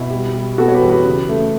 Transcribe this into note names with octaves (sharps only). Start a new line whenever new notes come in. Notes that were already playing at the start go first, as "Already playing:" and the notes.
Already playing: B2 E4
G3
G3
B3 F#4 A4
C#5
G4 B4
E2
G4 B4
C#3
A3